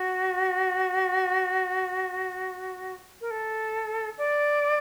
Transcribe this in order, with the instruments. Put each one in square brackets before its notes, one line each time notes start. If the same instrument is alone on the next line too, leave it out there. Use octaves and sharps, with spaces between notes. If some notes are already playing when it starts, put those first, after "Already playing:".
Already playing: [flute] F#4
A#4
A4
D5